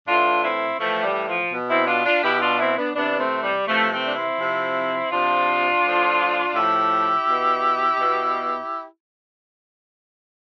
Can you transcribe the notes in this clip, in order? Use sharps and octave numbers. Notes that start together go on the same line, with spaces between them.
A2 E3 D4 F4
C4 E4
A2 E3 F3 A3
G3
F3
B2
C4 E4
D4 F4
D4 F4
B2 E4 G4
E4
D4 F4
C4 E4
B3 D4
C3 E3 B3 D4
A3 C4
G3
C3 E3 F3 A3
A3 C4
D4
C4 E4
C3 F3
C3 F3 D4 F4
A2 F3
A2 F3 E4 G4
B2
B2